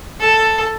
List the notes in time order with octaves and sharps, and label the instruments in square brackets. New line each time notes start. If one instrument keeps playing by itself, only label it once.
[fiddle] A4